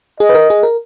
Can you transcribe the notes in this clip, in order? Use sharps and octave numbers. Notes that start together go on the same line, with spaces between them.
G#4 D#5
B4
A#4
G#4
A#4